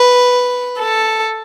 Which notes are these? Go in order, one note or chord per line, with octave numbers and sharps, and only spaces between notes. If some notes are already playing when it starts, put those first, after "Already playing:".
Already playing: B4
A4